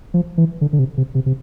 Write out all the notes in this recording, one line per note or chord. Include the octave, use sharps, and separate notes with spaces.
F3
E3
D3
D3
C3
C3
C3
C3